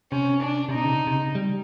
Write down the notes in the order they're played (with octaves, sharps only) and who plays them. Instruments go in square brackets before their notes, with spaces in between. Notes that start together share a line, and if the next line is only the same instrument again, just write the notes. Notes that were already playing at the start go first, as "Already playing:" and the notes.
[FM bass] C3 [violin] C#4
[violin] D4
[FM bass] C3
[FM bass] B2 [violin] D#4
[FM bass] C#3
C3
C3
C#3
G3